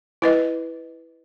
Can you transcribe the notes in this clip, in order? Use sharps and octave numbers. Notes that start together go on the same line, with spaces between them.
E4 B4 D#5